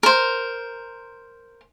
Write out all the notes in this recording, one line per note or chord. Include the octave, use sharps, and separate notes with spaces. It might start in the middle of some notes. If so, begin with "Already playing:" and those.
A#4 C5